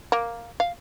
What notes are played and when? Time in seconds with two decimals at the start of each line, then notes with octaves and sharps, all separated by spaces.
0.12 A#3
0.60 F5